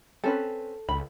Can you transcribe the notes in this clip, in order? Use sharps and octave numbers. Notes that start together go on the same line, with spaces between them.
C4 C#4 A4 B4
C#2 B5